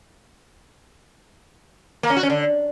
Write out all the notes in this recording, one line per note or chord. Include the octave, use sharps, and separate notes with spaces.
A#3
C#4
F#4
C#4
D3